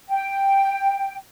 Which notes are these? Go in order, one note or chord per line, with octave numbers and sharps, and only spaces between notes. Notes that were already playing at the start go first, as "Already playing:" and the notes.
G5